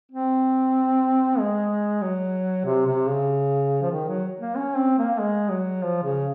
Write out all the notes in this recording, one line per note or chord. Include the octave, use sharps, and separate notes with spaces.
C4
G#3
F#3
C3
C3
C#3
F3
D#3
F#3
A#3
C#4
C4
A#3
G#3
F#3
F3
C#3